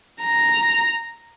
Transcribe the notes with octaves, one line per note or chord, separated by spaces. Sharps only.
A#5